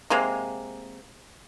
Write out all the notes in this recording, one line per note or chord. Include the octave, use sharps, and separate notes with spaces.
C3 G#3 A#3